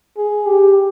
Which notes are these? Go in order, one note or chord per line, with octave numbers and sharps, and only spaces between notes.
G#4
G4